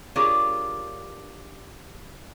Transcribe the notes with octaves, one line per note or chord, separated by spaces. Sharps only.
D4 F4 G4 G#4 A#4 C#5